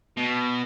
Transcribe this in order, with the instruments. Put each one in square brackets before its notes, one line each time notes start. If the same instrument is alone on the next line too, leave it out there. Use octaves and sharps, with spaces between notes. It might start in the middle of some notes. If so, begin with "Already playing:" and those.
[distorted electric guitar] B2